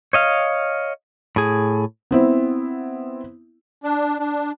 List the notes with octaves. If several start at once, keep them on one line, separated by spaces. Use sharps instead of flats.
C#5 D#5 F5
A2 G#4
B3 C4 E4
D4
D4